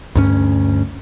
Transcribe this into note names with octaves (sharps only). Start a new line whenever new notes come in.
D2 G2 C#4